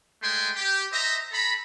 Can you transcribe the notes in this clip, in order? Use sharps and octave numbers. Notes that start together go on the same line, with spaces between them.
G#3 A3 G5 G#5 C6
G4
C5 D#5 E5 A#5
A4 A#5 B5